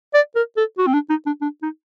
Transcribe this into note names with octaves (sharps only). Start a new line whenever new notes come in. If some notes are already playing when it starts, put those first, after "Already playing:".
D5
A#4
A4
F#4
C4
D4
D#4
D4
D4
D#4